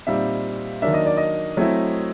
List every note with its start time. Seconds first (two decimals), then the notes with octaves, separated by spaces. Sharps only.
0.07 A#2 G3 C4 D#4 E5
0.82 D#3 F#3 A#3 D4 E5
0.94 D#5
1.06 D5
1.17 D#5
1.57 F#3 A3 C4 E4